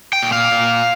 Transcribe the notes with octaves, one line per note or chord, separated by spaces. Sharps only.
G5
A#2
F5
A#2